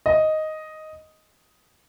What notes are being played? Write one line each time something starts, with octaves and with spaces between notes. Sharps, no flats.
D#5